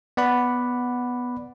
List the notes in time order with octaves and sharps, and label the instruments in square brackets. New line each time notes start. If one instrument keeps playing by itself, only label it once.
[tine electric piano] B3 D5 F#5 B5